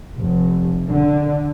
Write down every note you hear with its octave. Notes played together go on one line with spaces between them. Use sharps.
F1
D3